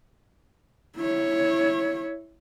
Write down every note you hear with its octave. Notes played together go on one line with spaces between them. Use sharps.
E4 C#5